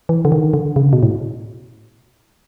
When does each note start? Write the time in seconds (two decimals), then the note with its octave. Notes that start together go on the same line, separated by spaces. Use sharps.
0.09 E3
0.25 D3
0.32 D#3
0.54 D3
0.76 C#3
0.93 B2
1.03 A2